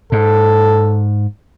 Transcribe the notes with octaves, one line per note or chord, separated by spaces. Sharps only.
G#2 A4